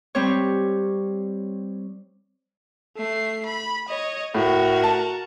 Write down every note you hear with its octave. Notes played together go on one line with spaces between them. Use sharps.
G3 C4 C#5
A3 C7
B5
C#5 D#5
A2 F#4 A#4
A5